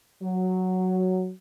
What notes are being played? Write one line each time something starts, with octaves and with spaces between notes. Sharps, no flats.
F#3